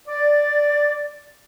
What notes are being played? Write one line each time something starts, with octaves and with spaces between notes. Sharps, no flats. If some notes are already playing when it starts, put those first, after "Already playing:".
D5